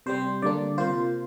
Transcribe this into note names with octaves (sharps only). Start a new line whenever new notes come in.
C3 G3 C4 C5
D3 G3 A#3 D4 D5
C3 A#3 F4 C5